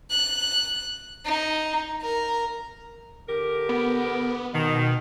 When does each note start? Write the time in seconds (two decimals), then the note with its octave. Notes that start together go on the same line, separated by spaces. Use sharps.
0.11 F#6
1.26 D#4
2.02 A#4
3.29 D3 G4 A#4
3.69 B3
4.54 B2 D#3